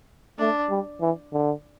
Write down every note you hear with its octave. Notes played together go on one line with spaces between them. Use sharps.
A3 D4
G3
E3
D3